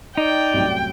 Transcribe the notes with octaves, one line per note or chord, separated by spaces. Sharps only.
D#4 D5 G5
C2 F#2 A2